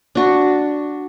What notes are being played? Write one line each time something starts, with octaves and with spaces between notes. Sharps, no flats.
D4 F#4